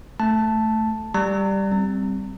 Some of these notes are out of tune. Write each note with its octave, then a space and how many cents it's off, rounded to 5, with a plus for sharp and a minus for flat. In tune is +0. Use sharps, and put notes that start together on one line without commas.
A3 +0 A5 +0
G3 +0 A#5 -35
G3 +0 C4 +0